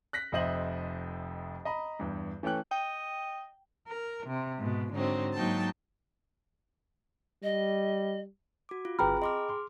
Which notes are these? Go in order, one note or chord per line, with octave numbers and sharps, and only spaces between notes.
F#6 A#6 B6
F1 F2 C5 D#5 E5 F#7
D#5 A#5 B5
E2 G2
E3 A3 C#4 G5 F#6
D#5 G5
A#4
C3
G#2 B2
G#2 D3 F#3 C4 D#4
G#2 F#3 A#3 D#4 G5 A5
G3 D#5
F#4 D6
F4
G1 C4 G#4 B4 G5 A#5 B5 F6
G#4 D#5 C6 D6 F6
C6